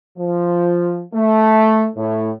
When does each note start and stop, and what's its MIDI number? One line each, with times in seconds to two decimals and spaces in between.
0.17 1.02 53
1.13 1.86 57
1.96 2.30 45